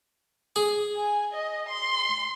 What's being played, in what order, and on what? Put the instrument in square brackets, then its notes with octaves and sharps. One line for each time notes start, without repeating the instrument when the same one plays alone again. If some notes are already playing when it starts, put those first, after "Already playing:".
[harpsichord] G#4
[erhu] G#5
D#5
C6